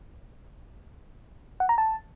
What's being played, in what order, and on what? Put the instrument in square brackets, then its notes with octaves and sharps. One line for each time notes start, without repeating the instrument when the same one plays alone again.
[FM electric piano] F#5
A#5
A5